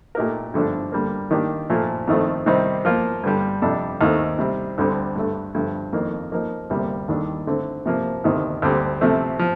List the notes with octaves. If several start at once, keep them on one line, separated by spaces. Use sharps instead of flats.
A#2 A3 D#4 G4 A#4
G2 D3 F3 A3 D4
D3 G3 A#3
D#3 A#3 D4 G4
A#2 F3 A3
F2 D#3 A3 C4 F4
C3 D#3 G3 C4 D#4
F3 A#3 F4
G2 D3 G3
F2 C3 G3 D4 A4
D#2 D#3 A3 C4
C3 G3 C4
D2 D3 G3 C4
G2 D3 A3
G2 D3 F3 A3
F2 D#3 A#3
F3 A#3 D#4 A#4
D2 C3 G3 A#3
D#2 D#3 G3 D4 A4
D3 A3 C4
C3 F3 A#3
D2 C3 D#3
D2 D3 G3 C4 G4
C3 F3 A3 C4
F3